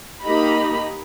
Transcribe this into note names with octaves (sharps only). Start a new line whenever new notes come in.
A#3 D#4 G4 D#5 A#5 B5